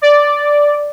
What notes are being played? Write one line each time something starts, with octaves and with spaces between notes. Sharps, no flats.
D5